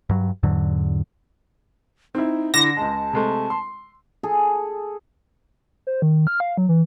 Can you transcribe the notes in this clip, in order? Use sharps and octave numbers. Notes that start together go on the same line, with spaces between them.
G2 F#3
E2 G#2 D3 F#3
C4 D#4 E4
D3 E4 D6 A#6 E7
C#2 G#3 A5
C3 G#3 A3
C6
G#4 A4
C5
D#3
F6
F5
F#3
E3